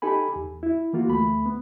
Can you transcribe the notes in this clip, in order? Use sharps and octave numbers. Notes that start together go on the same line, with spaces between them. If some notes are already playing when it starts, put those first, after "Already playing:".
D#4 G4 A4 G#5 B5
E2
E4
E3 A#3 F4 F#4
D2 A3 B5
B3